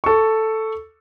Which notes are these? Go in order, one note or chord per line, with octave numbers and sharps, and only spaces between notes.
A4 C#6